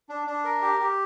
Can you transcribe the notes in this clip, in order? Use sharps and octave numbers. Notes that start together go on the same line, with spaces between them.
D4
D4
A#4
G4
G4